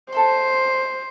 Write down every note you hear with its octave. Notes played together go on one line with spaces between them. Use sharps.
A4 C5 E5 C6